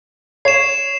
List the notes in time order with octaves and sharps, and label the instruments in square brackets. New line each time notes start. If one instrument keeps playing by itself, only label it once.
[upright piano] C#5 [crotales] C7 E7